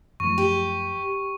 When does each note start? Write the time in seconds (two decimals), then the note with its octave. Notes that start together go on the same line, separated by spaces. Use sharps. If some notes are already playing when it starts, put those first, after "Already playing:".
0.20 F#2 F3 A3 C#6
0.38 G4